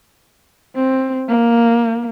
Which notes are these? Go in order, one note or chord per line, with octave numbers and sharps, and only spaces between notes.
C4
A#3